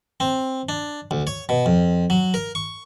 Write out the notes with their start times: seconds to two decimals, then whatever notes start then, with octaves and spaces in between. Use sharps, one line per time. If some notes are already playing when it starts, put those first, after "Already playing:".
0.20 C4
0.69 D4
1.11 D2
1.27 C#5
1.49 B2
1.66 F2
2.10 F#3
2.34 A#4
2.55 C#6